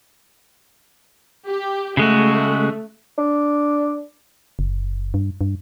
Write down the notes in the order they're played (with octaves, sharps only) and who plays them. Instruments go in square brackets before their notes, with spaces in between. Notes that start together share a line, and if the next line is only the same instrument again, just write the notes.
[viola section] G4
[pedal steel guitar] C#3 G#3 F#4 [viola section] A3
[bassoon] D4
[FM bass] F#1
G2
G2